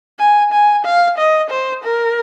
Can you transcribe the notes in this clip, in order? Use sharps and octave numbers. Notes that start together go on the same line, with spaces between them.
G#5
G#5
F5
D#5
C5
A#4